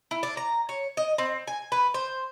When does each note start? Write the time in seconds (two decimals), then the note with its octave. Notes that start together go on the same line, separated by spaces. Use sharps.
0.11 E4
0.23 D4
0.37 A#5
0.69 C#5
0.97 D#5
1.18 C4
1.47 G#5
1.72 B4
1.94 C5